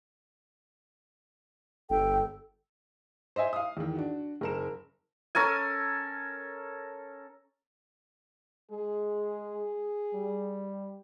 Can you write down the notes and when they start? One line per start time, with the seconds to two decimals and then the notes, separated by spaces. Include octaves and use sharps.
1.90 G1 A4 G5
3.36 C5 D#5 E5 G#5
3.53 F5 D#6
3.77 E2 D#3
3.95 D4 F#4
4.41 F#1 A#4 E7
5.35 C#4 A4 A#4 G#5
8.71 G#3 G#4
10.14 G3